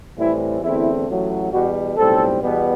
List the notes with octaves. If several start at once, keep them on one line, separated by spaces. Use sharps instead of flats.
A2 E3 G3 C4 E4
E2 D3 A3 C4 E4
A1 A2 F#3
E2 B2 G3 F#4
B1 A2 G3 C4 A4
E2 B2 G3 B3